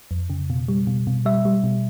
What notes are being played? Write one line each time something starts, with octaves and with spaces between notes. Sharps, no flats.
F2
C#3
B2
G3
B2
B2
G3 E5
G3
B2